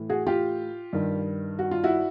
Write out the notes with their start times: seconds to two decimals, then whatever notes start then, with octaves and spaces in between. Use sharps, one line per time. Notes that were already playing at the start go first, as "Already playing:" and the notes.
Already playing: A2 E3
0.10 F#4 G#4
0.27 F4 G4
0.93 G2 D#3
1.59 F#4
1.71 F4
1.84 E4 F#4